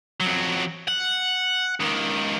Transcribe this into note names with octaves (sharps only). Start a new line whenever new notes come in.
F2 F#3
F#5
C#2 D#3